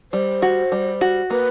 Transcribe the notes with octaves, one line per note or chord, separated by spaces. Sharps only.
G3 C5
F#4
G3
F#4
A#3 B4